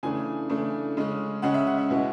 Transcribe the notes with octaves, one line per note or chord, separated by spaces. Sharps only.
C#3 E3 A3 D4 G#5
C#3 E3 A3 D4
C#3 G#3 C#4
C#3 G#3 C#4 F#5
E5
F#5
E5
B2 G#3 B3 E4